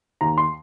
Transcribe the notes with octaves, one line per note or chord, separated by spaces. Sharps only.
D#2 A#5
C6